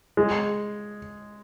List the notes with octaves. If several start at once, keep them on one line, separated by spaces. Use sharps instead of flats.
G#3